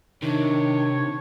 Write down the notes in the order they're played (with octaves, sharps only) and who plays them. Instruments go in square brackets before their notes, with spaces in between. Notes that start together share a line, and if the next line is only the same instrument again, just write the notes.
[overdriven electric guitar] C3 [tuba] D#3 [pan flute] D4 [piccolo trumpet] C#5